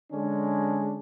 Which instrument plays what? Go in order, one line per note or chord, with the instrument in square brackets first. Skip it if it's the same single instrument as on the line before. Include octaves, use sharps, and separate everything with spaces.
[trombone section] D3 G#3 C#4 D4